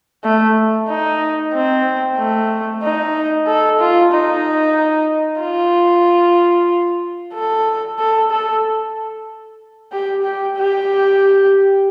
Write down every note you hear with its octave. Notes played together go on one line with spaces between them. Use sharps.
A3
D#4
C4
A3
D#4
A4
F4
D#4
F4
A4
A4
A4
G4
G4
G4